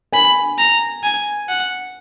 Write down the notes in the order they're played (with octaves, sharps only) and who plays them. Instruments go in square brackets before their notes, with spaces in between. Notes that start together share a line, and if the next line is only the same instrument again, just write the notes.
[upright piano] G#5 [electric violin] B5
[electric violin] A#5
G#5
F#5